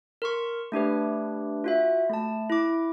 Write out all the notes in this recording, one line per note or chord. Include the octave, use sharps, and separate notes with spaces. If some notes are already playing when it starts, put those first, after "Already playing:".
A#4 C6 C#6
A3 D4 G4 B4
F4 F#4 E5
A3 A5
E4 D6